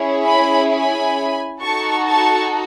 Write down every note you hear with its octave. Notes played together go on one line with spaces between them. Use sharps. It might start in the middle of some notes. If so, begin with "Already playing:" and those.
Already playing: C#4 E4 G#4
G#5 B5
G#5 B5
D#4 F#4 A4 A5 C#6
A5 C#6